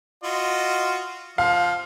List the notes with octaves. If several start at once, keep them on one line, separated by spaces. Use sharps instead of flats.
F4 F#4 D#5
F3 F5